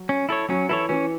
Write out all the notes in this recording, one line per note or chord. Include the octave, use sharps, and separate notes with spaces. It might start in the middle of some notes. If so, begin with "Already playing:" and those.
Already playing: F#3
C#4
E4 A4 C#5
F#3 C#4
E3 E4 A4 C#5
E3 C#4